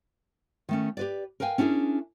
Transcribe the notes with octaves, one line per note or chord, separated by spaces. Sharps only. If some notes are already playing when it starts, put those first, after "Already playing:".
D#3 A3 C#4
G4 B4 D5
A#4 B4 F5 G5 G#5
C#4 D4 E4 G4 G#4 A#4